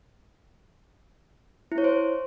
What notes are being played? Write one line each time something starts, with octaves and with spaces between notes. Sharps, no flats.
E4
C#5
C5